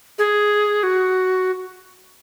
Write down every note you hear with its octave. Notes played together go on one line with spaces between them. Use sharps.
G#4
F#4